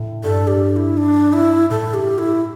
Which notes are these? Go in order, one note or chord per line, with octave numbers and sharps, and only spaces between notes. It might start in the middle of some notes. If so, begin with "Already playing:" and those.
Already playing: A2
G2 A4
G4
G4
E4
D4
E4
A2 A4
G4
E4